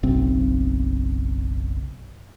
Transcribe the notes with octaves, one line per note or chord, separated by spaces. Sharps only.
F#1 B1 C4